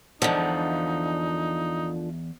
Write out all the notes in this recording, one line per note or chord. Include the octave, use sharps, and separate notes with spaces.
E2 D3 F3 D#4 D#5 F#5